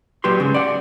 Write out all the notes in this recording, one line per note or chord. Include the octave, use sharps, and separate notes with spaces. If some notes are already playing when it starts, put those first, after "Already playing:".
A#2 F#3 G4 B4 C6
G#2 C#3
D5 F#5